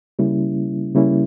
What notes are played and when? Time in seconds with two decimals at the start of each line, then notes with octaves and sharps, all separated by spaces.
0.19 C#3 G3 A#3 C#4 E4
0.95 C#3 G3 A#3 C#4 E4